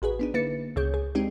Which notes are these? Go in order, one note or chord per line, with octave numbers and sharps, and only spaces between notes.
A1 F#4 G#4 B4
B3 D4 D#4
D3 A#3 E4 B4 A6 C#7
C#2 C#3 G#4 C#5 G6
G#4
G#3 C4 D4 D#4 G4